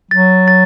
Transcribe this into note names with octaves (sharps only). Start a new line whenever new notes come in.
F#3 A6
A6